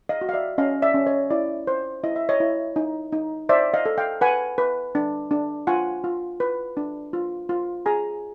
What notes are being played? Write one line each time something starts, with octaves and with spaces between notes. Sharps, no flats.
D#5 F5
F#4
F5
D5 E5
C#4 D#5 F5
D5 E5
C#4
C#5 D#5
E4 D5
C5
E4 D#5
E5
C#5 D#5
E4
D#4
D#4
C5 D5 E5
D#5 F5
A4
F5 G5
B4 F#5 G#5
B4
D4
D4
F4 F#5 G#5
F4
B4
D4
F4
F4
G#4 G#5 A#5